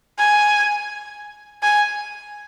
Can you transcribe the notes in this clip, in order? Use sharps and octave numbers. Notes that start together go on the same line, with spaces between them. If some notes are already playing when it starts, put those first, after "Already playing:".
G#5
G#5